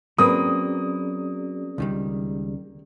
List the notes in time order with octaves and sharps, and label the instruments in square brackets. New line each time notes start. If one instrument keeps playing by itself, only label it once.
[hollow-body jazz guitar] F#3 [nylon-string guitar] A#3 C4 B4 [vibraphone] C#4 G#4 D5 [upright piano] D#6
[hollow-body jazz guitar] C#2 D#3 G3